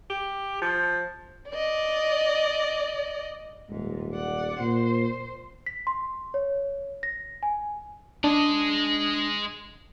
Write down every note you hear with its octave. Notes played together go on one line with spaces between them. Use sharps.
G4
F3
D5 D#5
D#1 G#2
D5 F#5
A#2 C5
B6
C6
C#5
A#6
G#5
G#3 D4 D#5